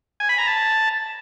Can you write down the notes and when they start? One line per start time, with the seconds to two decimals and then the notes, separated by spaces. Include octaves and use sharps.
0.20 G#5
0.29 B5
0.38 A#5
0.47 A5